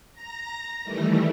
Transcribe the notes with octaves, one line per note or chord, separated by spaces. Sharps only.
A#5 A#6
D#3 E3 G3 A3